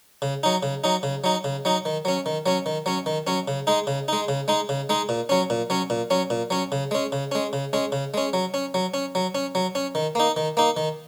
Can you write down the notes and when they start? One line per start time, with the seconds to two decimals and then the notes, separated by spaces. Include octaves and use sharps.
0.22 C#3
0.43 F#3 D#4
0.63 C#3
0.84 F#3 D#4
1.03 C#3
1.24 F#3 D#4
1.44 C#3
1.65 F#3 D#4
1.85 D#3
2.05 F#3 C#4
2.26 D#3
2.46 F#3 C#4
2.66 D#3
2.86 F#3 C#4
3.06 D#3
3.27 F#3 C#4
3.48 C#3
3.67 G#3 D#4
3.87 C#3
4.08 G#3 D#4
4.28 C#3
4.48 G#3 D#4
4.69 C#3
4.89 G#3 D#4
5.09 A#2
5.29 F#3 C#4
5.50 A#2
5.70 F#3 C#4
5.90 A#2
6.10 F#3 C#4
6.30 A#2
6.50 F#3 C#4
6.72 C#3
6.91 G#3 C#4
7.12 C#3
7.32 G#3 C#4
7.53 C#3
7.73 G#3 C#4
7.92 C#3
8.14 G#3 C#4
8.33 F#3
8.54 C#4
8.74 F#3
8.94 C#4
9.15 F#3
9.35 C#4
9.55 F#3
9.75 C#4
9.95 D#3
10.15 A#3 D#4
10.36 D#3
10.57 A#3 D#4
10.77 D#3